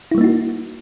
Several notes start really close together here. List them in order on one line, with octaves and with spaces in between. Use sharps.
E4 G3 A#3 D#4 F#4